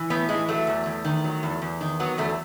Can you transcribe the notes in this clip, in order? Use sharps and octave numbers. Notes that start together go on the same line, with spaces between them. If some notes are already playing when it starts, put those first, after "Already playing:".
Already playing: E3
A2 B3
E3 G#3
F#3 A3
E2
E2
D#3
F#3
E2
E2
D#3
F#3 B3
E2 A3